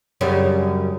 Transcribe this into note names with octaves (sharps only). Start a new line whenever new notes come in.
F#2 C#3 G3